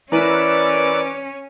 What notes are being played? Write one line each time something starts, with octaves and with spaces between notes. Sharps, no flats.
E3 C#4 A#4 B4 D5 E6